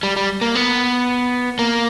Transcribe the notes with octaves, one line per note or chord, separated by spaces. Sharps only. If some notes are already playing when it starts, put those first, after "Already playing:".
G3
G3
A#3
B3
A#3